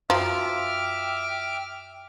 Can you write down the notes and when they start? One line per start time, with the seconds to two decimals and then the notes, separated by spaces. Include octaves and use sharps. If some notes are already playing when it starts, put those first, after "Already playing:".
0.10 F#2 F3 E5 G5 D6 F6